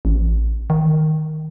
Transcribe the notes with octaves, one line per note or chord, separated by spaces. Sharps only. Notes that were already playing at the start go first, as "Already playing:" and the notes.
A1
D#3